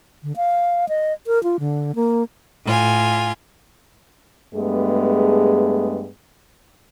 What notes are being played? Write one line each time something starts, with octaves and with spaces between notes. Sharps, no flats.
D3
F5
D#5
A#4
F4
D3
A#3
A2 F4 G#5
G2 G#3 A3 B3 G#4